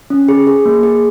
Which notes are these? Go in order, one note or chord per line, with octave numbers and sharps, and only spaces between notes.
C#4
G#4
G#4
A#3
G#4